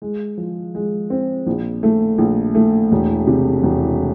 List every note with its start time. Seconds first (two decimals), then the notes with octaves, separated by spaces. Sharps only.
0.02 G#3
0.37 F3
0.75 G#3
1.10 C4
1.47 A#1
1.83 A3
2.18 A#1
2.55 A3
2.92 E1
3.27 C3
3.63 E1